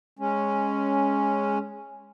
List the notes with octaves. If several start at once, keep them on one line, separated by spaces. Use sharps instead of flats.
G#3 C#4